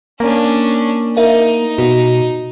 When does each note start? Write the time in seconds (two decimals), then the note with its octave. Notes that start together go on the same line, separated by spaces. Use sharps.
0.20 A#3 C#4 D4
1.17 D#4 A#4 E5 F5
1.78 B2 F#4